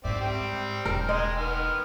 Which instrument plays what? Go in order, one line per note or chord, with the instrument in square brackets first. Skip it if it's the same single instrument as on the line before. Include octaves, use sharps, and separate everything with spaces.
[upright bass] G#2 [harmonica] C4 D5 E5
[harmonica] G3 C4 G5
[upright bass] E1 [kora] A#4
[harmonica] G#3 C6 [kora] D#5
[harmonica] D#3 B3 F6